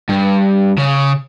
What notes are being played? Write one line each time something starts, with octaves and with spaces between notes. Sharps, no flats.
G2
C#3